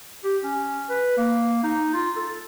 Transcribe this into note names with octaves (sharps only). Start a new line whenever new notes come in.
G4
C#4
B4
A#3
D#4
F4
A4